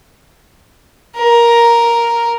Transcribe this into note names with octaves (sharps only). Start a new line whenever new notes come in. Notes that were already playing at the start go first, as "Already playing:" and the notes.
A#4